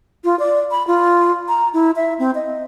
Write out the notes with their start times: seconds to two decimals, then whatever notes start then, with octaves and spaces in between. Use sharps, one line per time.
0.24 F4
0.39 D5
0.71 B5
0.87 F4
1.48 A#5
1.73 E4
1.96 E5
2.19 C4
2.35 D#5